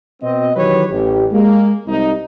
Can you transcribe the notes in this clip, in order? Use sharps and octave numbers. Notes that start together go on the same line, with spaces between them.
B2 C4 D#5
D#3 E3 F#3 G4 B4 C#5
A1 G4
G#3 A#3
C2 D#4